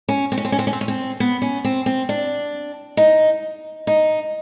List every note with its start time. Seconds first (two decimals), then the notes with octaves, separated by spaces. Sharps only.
0.09 C#4
0.32 C4
0.38 C#4
0.45 C4
0.52 C#4
0.59 C4
0.67 C#4
0.73 C4
0.81 C#4
0.88 C4
1.20 B3
1.42 C#4
1.64 C4
1.86 C4
2.09 D4
2.97 D#4
3.87 D#4